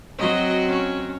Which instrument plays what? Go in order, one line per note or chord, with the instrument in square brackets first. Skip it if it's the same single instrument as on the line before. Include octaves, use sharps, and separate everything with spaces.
[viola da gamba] F#3 C4 F#4 [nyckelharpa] D#5
[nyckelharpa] C#4